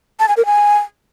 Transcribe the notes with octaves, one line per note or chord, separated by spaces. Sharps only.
A5
G#5
A#4
G#5